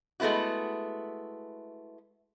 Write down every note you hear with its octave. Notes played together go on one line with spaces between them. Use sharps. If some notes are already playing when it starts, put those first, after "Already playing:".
G#3 A3 B3 E4 F#4